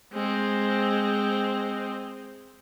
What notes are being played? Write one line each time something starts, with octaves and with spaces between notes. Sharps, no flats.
G#3 C4